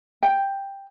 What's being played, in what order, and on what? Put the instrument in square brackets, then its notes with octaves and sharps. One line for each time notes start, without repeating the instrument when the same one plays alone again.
[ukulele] G5